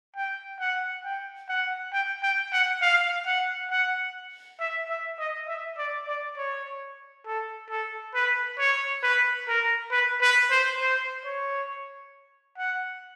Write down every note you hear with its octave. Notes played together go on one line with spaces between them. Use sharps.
G5
F#5
G5
F#5
G5
G5
F#5
F5
F#5
F#5
E5
E5
D#5
E5
D5
D5
C#5
A4
A4
B4
C#5
B4
A#4
B4
B4
C5
C5
C#5
F#5